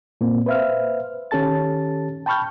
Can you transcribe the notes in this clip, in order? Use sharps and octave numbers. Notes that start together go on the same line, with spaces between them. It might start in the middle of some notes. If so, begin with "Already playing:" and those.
A#2 A#3 C4
B4 C5 E5 F5 F6
D#3 C#4 G4 A4 A5 A6
G5 A5 B5 C#6 F6 G6